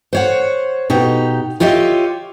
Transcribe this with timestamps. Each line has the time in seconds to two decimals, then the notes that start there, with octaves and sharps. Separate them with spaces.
0.13 C5 C#5 F#5
0.90 B2 D#4 G4
1.60 F4 G4 C#5 D#5 E5